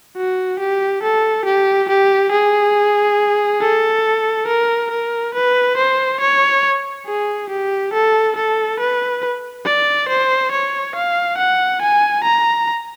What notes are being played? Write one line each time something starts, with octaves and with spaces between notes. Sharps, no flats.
F#4
G4
A4
G4
G4
G#4
A4
A#4
A#4
B4
C5
C#5
G#4
G4
A4
A4
B4
D5
C5
C#5
F5
F#5
G#5
A#5